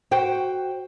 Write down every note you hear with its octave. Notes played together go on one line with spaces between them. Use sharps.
F#4 C5 G5